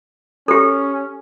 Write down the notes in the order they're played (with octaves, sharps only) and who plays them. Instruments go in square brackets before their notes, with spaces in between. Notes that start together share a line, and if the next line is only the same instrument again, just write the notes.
[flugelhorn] C#4 [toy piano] G4 A4